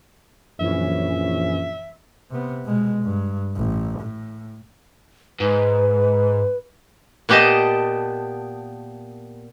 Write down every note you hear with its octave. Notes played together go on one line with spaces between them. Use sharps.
A#1 F#2 E3 C#4 E5
C3 B3
B2 G#3
G2
A1
A2
G#2 B4
A#2 B3 G4 D#5 A5